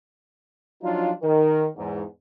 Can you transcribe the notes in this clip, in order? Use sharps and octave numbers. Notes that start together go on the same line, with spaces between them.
F3 F#3 D4 D#4 F4
D#3 A#4
E2 G#2